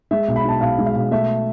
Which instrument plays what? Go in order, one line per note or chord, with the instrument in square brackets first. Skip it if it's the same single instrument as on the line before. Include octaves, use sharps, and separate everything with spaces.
[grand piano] G#3 E5
B1
B5
B2 A5
B1 F5
G#3
F5
B1
A3 E5